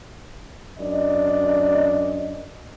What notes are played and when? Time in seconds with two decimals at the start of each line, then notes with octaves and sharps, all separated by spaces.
0.79 F#2 D4 D5 D#5